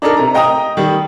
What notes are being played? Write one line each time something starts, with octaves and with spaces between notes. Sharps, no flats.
D4 D#4 A4 A#4
C3 A#5
D#5 G5 A#5 D#6
D#3 G3